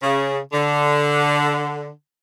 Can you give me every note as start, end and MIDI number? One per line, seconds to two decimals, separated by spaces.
0.02 0.38 49
0.52 1.87 50